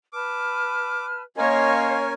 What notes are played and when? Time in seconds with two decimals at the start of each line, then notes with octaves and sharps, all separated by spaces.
0.13 B4 A5 D6 F6
1.37 A#3 C#4 A#4 C#5 D#5 F5 G#5 C6